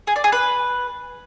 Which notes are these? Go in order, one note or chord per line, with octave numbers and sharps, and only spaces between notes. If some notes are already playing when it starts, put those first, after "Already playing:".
G#4
D5
G#4
B4